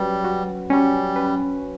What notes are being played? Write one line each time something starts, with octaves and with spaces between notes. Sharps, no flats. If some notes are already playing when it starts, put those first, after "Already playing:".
Already playing: F#3 G3 C#4 B4
F#4
G3 C#4
B4